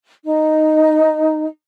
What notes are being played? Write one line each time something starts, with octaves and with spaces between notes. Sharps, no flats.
D#4